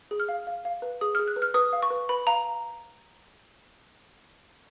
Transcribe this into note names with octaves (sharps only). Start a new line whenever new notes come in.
G#4
F6
F5
F5
F5
B4
G#4 D#6
G#4 F6
F#6
B4
F6
B4 D#6
F5
C#6
B4
B4 B5
F5 A#5